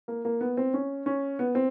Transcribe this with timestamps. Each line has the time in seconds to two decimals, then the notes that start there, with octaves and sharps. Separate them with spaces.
0.08 A#3
0.25 A#3
0.41 B3
0.57 C4
0.74 C#4
1.06 C#4
1.39 B3
1.55 C4